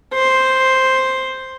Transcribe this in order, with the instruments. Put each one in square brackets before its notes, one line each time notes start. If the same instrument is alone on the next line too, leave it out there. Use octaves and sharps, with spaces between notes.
[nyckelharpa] C5